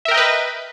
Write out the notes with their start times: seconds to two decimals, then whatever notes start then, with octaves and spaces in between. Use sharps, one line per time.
0.05 E5
0.08 A#4
0.11 G5
0.14 D#5
0.17 B4